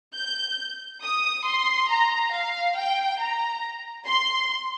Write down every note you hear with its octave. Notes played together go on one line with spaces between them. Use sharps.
G6
D#6
C6
A#5
F5
G5
A#5
C6